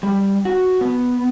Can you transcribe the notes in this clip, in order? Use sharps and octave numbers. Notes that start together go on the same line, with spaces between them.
G3
F#4
B3